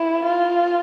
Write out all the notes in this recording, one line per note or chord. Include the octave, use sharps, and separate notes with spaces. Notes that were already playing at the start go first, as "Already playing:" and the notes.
Already playing: E4
F4